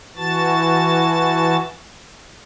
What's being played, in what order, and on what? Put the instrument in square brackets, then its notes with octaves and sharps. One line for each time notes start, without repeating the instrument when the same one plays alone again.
[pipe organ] E3 F#4 A5 A6